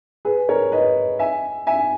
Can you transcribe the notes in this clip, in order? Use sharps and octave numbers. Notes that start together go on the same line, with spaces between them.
G#4 B4
A#4 C#5
B4 D#5
E5 G#5
E5 G#5